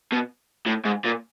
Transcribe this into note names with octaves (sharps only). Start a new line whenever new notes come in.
B2
A2
G#2
A#2